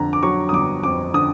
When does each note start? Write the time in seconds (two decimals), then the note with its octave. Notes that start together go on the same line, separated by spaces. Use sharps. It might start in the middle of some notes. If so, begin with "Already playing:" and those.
Already playing: F2 D3 A#5
0.13 D6
0.23 F#3 C#6
0.49 D#6
0.53 G1 D6
0.83 F2 D6
1.14 D3 D#6